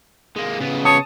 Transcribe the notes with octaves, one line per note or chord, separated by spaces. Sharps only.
G#3 A#3
C#3 B3
C#5 A5 D#6